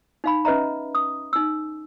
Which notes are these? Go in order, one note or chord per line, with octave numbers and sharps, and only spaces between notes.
D#4 F5 B5
C#4 B4 D#5 E5 A#5
D#6
D#4 E6